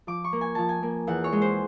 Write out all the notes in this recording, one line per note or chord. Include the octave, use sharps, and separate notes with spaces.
F3 D6
C#6
A#3
G#5
F3 A5
G#5
A#3
E2 F#5
C#5
G#3
C5